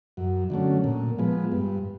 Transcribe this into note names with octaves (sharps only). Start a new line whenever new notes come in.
F#2
D3 F#3 A3 C#4
A#2
F3 G#3 B3
G2